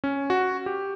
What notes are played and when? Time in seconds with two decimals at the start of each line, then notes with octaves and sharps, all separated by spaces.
0.04 C#4
0.30 F#4
0.66 G4